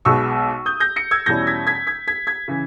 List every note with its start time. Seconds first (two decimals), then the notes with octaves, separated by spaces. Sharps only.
0.05 B1 B2 G#3 B3 C#6 E6
0.66 D#6 G6
0.80 G6 A#6
0.96 A#6 C#7
1.11 E6 G#6
1.26 E2 B2 G3 C#4 E4 G6 A#6
1.47 G#6 B6
1.67 G#6 B6
1.87 G#6 B6
2.08 G#6 B6
2.27 G#6 B6
2.48 C#3 E3